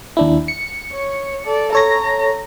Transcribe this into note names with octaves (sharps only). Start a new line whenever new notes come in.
D#2 D4 E4
C#7
C#5
A4 D5
A4 C#5 A#5 A#6